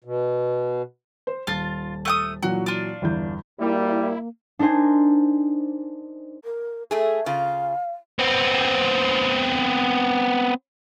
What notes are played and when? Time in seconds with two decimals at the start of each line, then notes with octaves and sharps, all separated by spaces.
0.04 B2
1.27 C5
1.47 D#1 F4 A5 A6
2.05 A3 F#5 D#6
2.43 A#2 E3 F#3 F#4
2.66 D4 F4
3.02 G1 E2 G6
3.59 G#1 G3 A#3 E4
4.59 D4 D#4 A#4 C5 G#5
6.44 A#4
6.91 A3 G#4 A4
7.26 C#3 F4 F5
8.19 B3 C4